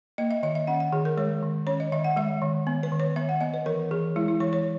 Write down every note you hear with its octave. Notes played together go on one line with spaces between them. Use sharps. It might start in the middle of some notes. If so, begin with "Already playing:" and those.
A#3 D#5
E5
D#3 D#5
E5
C#4 F#5
F#5
D#3 G#4
A#4
G#3 C#5
D#3
C#4 C#5
D#5
D#3 E5
F#5
G#3 E5
D#3
B3
B4
D#3
C#5
B3 E5
F#5
B3 D#5
B4
E3 A#4
E3 G#4
G#3 E4
E4
E3 C#5
C#5